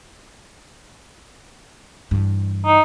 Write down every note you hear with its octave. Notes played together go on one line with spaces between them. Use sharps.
G2 E3
D#4